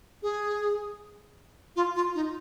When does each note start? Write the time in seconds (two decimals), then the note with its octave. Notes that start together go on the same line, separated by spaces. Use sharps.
0.22 G#4
1.76 F4
1.95 F4
2.15 D#4